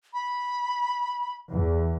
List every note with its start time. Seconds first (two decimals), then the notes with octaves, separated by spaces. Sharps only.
0.14 B5
1.50 E2